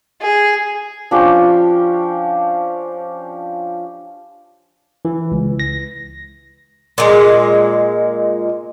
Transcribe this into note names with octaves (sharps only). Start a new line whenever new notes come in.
G#4
F3 C#4 D4 G4
E3
C#2
A#6
A#2 G#3